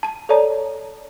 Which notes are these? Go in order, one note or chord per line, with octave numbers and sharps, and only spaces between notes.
A5 D#7
A4 C#5 D5 A5 A#5